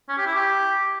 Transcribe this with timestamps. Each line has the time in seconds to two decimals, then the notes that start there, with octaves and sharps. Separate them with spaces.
0.09 C#4
0.18 G4
0.26 E4
0.35 G4